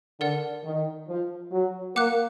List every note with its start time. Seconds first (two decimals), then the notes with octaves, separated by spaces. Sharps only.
0.21 D3 A#4 D5 F#5
0.64 D#3
1.08 F3
1.52 F#3
1.96 A#3 F#5 D6 F#6